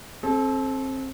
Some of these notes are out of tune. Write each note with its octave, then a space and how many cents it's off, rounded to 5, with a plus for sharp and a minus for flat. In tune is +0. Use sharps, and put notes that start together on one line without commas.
C4 +25 A4 -30